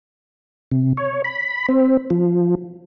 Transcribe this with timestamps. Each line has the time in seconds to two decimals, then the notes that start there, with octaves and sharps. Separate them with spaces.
0.72 C3
0.97 C#5
1.24 B5
1.69 C4
2.10 F3